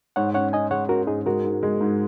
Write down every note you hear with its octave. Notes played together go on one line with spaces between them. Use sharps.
G#2 C#5 F#5
C#4 C#5 F#5
C#4 D#5 G#5
G#3 C#5 F#5
C#4 F#4 A#4
G#2 D#4 G#4
G#3 F#4 A#4
G#2
G#3
G#2